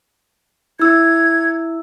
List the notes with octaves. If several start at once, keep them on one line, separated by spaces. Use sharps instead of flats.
E4 E6 G#6